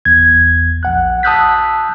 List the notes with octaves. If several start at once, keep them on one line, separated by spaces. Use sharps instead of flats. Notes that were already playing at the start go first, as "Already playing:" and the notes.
G1 E2 G#6
A#1 F#5 F#6
A5 D#6 E6 F#6 G6 B6